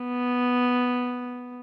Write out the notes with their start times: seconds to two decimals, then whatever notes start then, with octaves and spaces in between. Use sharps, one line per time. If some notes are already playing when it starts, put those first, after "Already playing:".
Already playing: B3